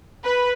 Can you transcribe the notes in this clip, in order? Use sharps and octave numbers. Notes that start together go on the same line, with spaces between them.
B4